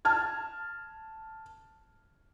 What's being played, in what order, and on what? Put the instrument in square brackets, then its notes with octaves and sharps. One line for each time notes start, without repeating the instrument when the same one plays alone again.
[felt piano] A5 F6 G#6